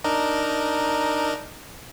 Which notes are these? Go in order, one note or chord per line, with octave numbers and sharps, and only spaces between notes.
D4 D#4 A#4